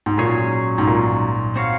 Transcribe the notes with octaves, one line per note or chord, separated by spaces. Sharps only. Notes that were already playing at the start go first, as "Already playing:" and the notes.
G#2
A#2 F#3 C#4 G#4 C#5
G#2
A#2
C4 F#4 C#5 F5